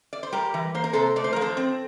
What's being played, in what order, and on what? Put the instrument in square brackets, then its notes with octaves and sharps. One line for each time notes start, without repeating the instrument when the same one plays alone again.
[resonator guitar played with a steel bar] D5
C5
G3 G4 A#4
E3
A#3 C5
A#4
C3 A4 C5
A3 D5
C5
A#4
F3
A4 C5
C4